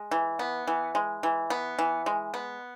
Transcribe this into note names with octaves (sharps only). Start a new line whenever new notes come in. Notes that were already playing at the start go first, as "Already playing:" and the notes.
Already playing: G#3
E3
B3
E3
G#3
E3
B3
E3
G#3
B3